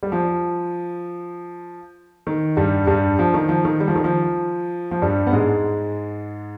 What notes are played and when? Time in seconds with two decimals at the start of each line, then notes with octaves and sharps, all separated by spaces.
0.03 G3
0.12 F3
2.27 D#3
2.57 G2 G3
2.87 G2 G3
3.19 F3
3.34 D#3
3.49 F3
3.65 D#3
3.80 G3
3.88 F3
3.95 D#3
4.04 F3
4.91 F3
5.02 G2 G3
5.27 B3
5.33 G#2 G#3